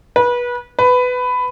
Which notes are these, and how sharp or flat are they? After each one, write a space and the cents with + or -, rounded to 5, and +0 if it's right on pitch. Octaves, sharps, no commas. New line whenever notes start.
B4 -25
B4 +15